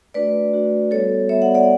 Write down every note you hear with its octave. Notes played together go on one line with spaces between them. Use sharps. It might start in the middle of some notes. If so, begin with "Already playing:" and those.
A3 D4 F#4 B4 D5
A3 D4 F#4
G3 B3 F#4 A4 C#5
G3 B3 F#4 C#5 E5
D5 F#5
D5 F#5